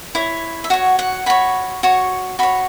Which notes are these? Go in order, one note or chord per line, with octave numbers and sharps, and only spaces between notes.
E4 C#5
E5
F#4 C#5 F#5
F#5
F#4 C#5 B5
F#4 C#5
F#4 C#5 B5